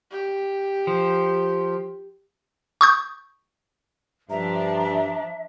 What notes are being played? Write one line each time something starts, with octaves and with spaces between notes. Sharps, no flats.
G4
F3
C#6 D#6 G6
G2 F3 D4 E5 A#5